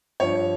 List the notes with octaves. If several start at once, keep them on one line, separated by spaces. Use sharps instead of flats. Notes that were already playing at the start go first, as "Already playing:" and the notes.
G2 F3 C#5